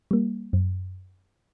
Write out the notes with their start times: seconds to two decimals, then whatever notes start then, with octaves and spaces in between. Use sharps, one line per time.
0.11 G3 A#3
0.53 F#2